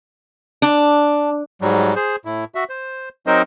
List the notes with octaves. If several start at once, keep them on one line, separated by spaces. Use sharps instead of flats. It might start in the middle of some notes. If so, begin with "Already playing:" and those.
D4
G#2 F#3 G3
G#4 C5
A2 E4
F#4 E5
C5
F#3 C4 D#4 A#4 C5 D#5